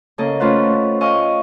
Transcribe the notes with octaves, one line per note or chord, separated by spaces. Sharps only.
C#3 A#3 A4 D#5
A3 C#4 F4 B4 C5 F#5
D#5 F5 G#5 C#6 D#6